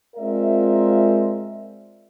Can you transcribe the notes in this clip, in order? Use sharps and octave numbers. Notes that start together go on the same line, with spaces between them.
G#3 C4 F4 A#4 D5 E5